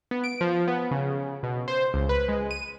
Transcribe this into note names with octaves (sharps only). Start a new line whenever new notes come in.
B3
D7
F3
B3
C#3
B2
C5
C#2
B4
G#3
D#7